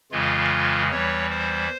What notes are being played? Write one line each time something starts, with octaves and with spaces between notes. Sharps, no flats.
F2 C#3 E3 G#3 F4
E2 E3 G3 C#5
C5